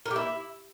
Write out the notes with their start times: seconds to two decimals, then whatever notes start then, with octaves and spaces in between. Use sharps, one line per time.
0.06 A#4
0.11 G4
0.16 E4